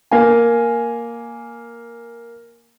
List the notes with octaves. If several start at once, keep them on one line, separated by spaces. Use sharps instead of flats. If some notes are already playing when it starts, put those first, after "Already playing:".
A#3 F5 G#5